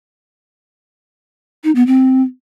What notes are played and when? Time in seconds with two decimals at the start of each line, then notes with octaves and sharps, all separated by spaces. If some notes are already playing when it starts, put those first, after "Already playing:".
1.64 D#4
1.75 B3
1.87 C4